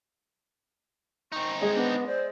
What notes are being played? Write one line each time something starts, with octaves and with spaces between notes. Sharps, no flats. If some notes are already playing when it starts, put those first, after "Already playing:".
C4 D#4 C#6
G#3 G#4
B3 D4
C5 D5